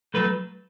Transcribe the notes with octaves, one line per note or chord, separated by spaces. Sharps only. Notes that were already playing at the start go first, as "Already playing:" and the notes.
F#3 A3 B4